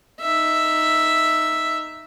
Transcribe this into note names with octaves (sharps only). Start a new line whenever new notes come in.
D#4 E5